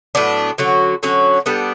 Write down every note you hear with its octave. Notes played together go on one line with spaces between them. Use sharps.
A2 F#3 B3 D4
D3 F#3 C#4 F#4
D3 F#3 C#4 F#4
G3 B3 D4 A4